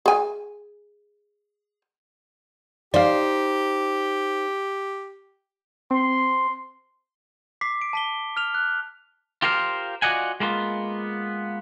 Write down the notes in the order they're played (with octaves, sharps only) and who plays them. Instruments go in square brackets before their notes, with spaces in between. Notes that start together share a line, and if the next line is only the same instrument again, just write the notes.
[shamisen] G#4 G#5
[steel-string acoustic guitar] D#4 C5 [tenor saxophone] G4 [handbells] D5 F5
[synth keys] C4 [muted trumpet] C6
[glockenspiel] D6 B6 C7
D7
A5 B6 G7
F6 F7
F#6
[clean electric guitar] F4 G4 A#4 C5 F5
F4 F#4 D5 D#5 F#5 G#5
G#3 A#3 B3 F4